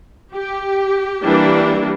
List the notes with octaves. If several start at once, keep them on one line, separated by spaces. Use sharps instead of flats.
G4
E3 G3 A#3 D4